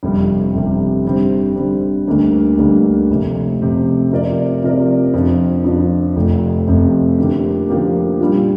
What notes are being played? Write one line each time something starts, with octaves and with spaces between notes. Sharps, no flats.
G1 F2 C3 G3
G1 F2 C3 G3
D3 G3 C4
D3 G3 C4
D2 D3 G3 A#3 D4
D2 D3 G3 A#3 D4
F1 F2 C3
F1 F2 C3
C3 F3 C4 A#4 D5
C3 F3 C4 A#4 D5
F2 F3 D4
F2 F3 D4
F1 F2 C3
F1 F2 C3
D3 F3 A#3 G4
D3 F3 A#3 G4
A#2 G3 D4 F4